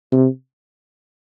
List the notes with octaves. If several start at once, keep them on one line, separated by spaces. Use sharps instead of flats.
C3